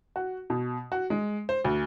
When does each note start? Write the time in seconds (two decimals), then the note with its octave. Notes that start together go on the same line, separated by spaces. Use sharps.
0.16 F#4
0.50 B2
0.92 F#4
1.10 G#3
1.49 C5
1.64 D2